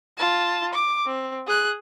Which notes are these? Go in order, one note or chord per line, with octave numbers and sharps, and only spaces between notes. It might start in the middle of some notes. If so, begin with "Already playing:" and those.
F4 A5
D6
C4
G#4 F#6